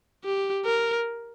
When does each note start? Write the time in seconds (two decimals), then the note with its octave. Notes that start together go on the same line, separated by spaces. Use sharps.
0.24 G4
0.66 A#4